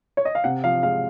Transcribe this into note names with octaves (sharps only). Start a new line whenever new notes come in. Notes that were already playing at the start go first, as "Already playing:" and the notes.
C#5
D#5
F5
C3 F#5
F3 F5
G#3 F5